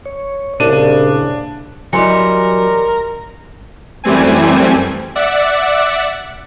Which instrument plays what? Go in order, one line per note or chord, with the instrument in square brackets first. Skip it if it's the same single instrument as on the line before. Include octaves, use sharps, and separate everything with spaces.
[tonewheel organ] C#5
[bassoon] C2 [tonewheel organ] A#2 [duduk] C#3 [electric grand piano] D4 D#7
[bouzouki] E3 G3 D#4 [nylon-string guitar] F#3 [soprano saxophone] A#4 [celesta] C6 C#7
[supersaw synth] F#2 E3 G3 A3 C4 G#5
D5 E5 F#5